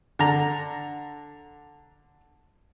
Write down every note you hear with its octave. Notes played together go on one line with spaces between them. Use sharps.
D3 A#5